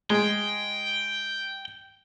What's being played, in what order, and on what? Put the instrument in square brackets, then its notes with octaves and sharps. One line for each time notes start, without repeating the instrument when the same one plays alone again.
[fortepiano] G#3 [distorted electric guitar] G5